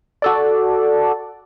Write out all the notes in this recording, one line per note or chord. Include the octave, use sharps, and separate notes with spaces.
F#4 A4 D5